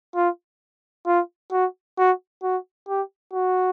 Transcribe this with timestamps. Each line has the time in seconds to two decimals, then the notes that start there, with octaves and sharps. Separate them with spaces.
0.15 F4
1.06 F4
1.52 F#4
1.98 F#4
2.43 F#4
2.88 G4
3.33 F#4